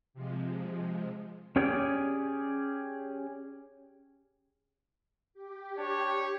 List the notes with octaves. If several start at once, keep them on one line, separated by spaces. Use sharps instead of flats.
C3 F3 G#3
C#4 G4 G#4 C#5 D5
G4
D4 C#5